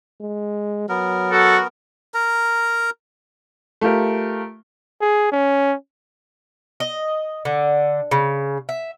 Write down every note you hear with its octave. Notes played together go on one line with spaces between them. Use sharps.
G#3
F#3 B3 A#4
F#4 A4
A#4 A#5
A3 F4 G4 A#4
G#4
C#4
D#5
D3
C#3
E5